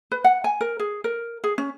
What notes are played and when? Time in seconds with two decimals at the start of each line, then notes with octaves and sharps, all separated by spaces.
0.12 B4
0.24 F#5
0.44 G#5
0.61 A#4
0.79 G#4
1.04 A#4
1.44 G#4
1.58 C#4